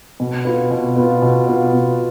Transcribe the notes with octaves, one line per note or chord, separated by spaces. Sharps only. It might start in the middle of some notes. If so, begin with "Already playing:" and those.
B2
B3 F4
B2
B3 F4
B2
B3 F4
B2